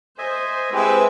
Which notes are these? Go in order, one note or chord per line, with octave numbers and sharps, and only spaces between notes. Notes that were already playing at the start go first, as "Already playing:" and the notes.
C5 D#5 E5 G#5
G#3 C4 E4 G4 B4 E5